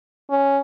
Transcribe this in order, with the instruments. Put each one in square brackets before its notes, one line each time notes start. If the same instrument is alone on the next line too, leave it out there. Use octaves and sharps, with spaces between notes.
[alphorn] C#4